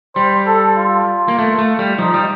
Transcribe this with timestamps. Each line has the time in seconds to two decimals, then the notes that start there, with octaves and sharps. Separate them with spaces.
0.16 G3 C5
0.47 A4
0.77 F4
1.28 A#3
1.39 A3
1.59 A3
1.79 G3
1.98 F3 D#4
2.14 G3